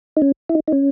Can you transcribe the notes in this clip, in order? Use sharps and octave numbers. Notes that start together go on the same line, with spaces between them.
D#4
C#4
E4
D#4
D#4
C#4